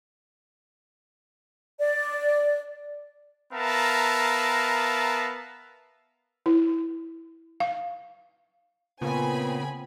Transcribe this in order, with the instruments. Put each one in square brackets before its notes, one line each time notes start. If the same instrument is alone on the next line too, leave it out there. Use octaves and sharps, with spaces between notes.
[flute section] D5
[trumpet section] B3 A#4 E5 F5 A5 A#5
[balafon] E4
F5
[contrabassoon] A#2 [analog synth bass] C#3 [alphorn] B3 [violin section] C4 G#5 B5